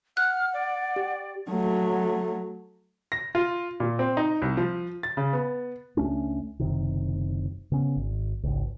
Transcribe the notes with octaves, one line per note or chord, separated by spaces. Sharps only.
F#5 F6 F#6
D5
G4
F#3 A3
A#6
F4
A#2
C4
D#4
C2
F3
A6
C#3
B3
C#2 A3 C#4 D4
F#1 D2 C3 D#3
C#3 B3 C#4
G#1
G#1 C#2